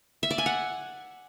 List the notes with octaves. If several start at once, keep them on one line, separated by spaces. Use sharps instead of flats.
E5
D5
G#5
F#5